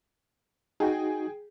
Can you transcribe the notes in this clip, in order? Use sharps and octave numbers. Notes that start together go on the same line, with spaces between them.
D#4 F#4 G#4 G5